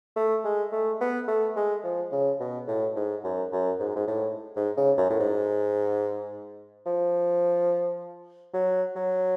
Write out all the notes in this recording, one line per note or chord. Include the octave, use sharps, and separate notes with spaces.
A3
G#3
A3
B3
A3
G#3
F3
C#3
B2
A2
G#2
F#2
F#2
G#2
G#2
A2
G#2
C#3
F#2
A2
G#2
F3
F#3
F#3